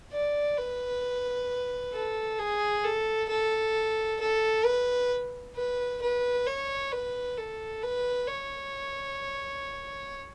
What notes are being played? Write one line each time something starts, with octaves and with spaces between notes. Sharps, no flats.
D5
B4
A4
G#4
A4
A4
A4
B4
B4
B4
C#5
B4
A4
B4
C#5